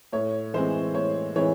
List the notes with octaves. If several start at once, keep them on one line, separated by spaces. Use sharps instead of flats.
A2 C#5
E3 G#3 C4 C5
A2 C#5
E3 G#3 C4 C#5